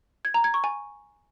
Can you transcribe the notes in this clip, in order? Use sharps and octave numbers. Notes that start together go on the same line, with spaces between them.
G#6
A#5
G#6
C#6
G#5